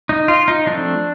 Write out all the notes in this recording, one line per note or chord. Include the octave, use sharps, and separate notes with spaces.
D#4
F4
D#4
F3 A3 C4 D4